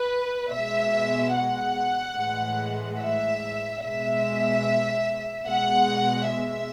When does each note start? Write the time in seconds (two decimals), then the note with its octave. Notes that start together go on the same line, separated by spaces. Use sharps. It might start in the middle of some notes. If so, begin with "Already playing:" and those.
Already playing: B4
0.51 B2 G#3 E5
1.34 F#5
2.17 A2 E3 G#3
3.00 E5
3.82 B2 G#3 E5
5.47 B2 G#3 F#5
6.29 E5